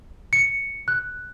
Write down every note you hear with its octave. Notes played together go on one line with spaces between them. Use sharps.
C#7
F#6